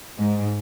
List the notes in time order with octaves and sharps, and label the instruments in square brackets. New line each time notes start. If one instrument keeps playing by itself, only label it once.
[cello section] G#2